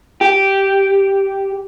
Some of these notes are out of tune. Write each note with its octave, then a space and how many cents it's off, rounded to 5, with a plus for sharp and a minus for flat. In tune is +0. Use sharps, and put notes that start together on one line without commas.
G4 -5